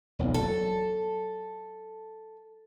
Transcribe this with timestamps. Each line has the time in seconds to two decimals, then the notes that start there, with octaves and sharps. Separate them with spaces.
0.19 E1 B1 F2
0.34 F#3 A4